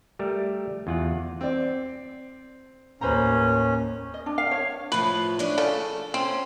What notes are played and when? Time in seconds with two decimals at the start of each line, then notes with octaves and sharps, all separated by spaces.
0.19 G3 A3 A#4
0.87 E2 F4 F#5
1.41 C4 D5
3.01 D#2 A2 C#4 B4 C5 A#5
4.14 D#5
4.26 D4
4.38 F5
4.51 C#5
4.92 A2 F3 B4
5.39 C#4 D4 E4
5.58 C#3 A4
6.14 C4 C#4